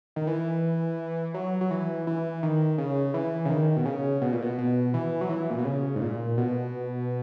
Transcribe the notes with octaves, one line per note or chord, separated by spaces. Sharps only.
D#3
E3
F#3
F#3
E3
E3
D#3
C#3
E3
C#3
D#3
B2
C#3
B2
A#2
B2
B2
E3
F#3
E3
A#2
B2
C#3
G#2
A#2
B2